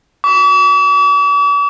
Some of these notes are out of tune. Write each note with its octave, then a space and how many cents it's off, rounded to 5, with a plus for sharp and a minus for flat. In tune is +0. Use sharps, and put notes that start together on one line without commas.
D6 -45